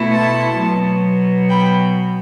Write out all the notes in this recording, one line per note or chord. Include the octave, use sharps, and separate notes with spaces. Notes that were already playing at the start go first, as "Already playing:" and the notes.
Already playing: B2 A3 E4
A5 C6
B2 F#3 B3
G5 B5